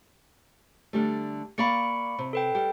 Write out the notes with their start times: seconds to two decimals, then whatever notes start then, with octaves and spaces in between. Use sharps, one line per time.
0.93 D3 G3 A3
1.58 A#3 D5 F5 B5 C#6 C#7
2.19 C3
2.33 A4 B4 G5
2.55 G3 G5